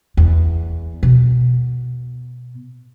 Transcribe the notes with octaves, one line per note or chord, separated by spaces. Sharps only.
E2
B2